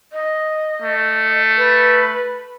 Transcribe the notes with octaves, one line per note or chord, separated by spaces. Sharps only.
D#5
A3
B4